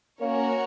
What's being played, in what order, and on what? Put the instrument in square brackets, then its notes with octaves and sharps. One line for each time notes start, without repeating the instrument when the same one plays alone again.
[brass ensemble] A#3 C#4 [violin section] F#4 A#4 C#5